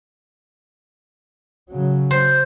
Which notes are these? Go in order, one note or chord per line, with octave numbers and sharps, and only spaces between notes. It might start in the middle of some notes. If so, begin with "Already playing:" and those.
C#3 F#3
C5